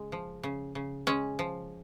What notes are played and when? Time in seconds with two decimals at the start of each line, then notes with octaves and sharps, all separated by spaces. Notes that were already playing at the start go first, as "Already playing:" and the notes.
Already playing: C#3 G#3
0.12 F3
0.43 C#3
0.75 C#3
1.07 G#3 C#4
1.39 F3